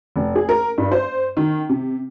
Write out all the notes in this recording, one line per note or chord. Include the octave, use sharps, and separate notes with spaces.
F1
G#4
A#4
G2
C5
D#3
C3